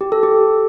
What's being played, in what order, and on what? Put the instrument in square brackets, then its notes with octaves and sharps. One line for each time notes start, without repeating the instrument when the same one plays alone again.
[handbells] G4
A4
G4